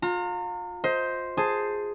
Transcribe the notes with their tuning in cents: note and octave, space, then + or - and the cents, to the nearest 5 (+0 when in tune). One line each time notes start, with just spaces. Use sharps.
F4 +30 A#5 -30
C5 +0 D#5 +25
G#4 +0 C5 +0 A5 +10